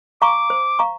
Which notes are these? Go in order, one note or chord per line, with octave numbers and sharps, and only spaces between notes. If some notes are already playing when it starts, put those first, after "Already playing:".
F5 A#5 C#6 D6
C5
F5 A#5 C#6